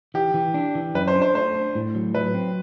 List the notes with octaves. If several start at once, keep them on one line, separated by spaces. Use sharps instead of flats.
E3 G4
E3
D4
E3
F#2 B4
C5
D4
C5
A3 C5
D4
A2
F#3
F#3 B4
C4